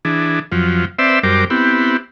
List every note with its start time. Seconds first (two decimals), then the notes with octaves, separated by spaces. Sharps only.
0.05 E3 D4 G#4
0.52 F2 F3 F#3
0.99 C4 B4 C5 D5 E5 E6
1.23 F#2 G3 A#4 C5 D6
1.50 B3 C4 E4 G4